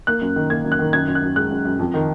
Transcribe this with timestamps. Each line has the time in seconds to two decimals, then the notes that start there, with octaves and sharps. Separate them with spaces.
0.07 A#3 F#6
0.21 F#2
0.36 D#3
0.50 A#3 G#6
0.64 F#2
0.72 F#6
0.79 D#3
0.93 F#2 G#6
1.08 F#2
1.15 F#6
1.22 F#2
1.36 G#3 F#6
1.51 F#2
1.65 F#2
1.79 F2
1.94 D#3